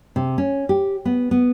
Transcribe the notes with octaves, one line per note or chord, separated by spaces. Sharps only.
C3
C#4
G4
B3
B3